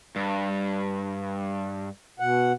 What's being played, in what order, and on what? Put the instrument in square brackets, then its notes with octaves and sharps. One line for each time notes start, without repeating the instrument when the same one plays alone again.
[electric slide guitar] G2
[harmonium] B2 F#5